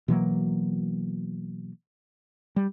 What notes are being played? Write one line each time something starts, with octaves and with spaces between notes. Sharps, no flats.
B2 E3 F#3 A#3
G3